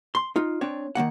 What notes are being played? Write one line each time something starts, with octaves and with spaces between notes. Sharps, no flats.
C6
D#4 F4
C4 D4 C#5
D#3 F#3 A#3 F#5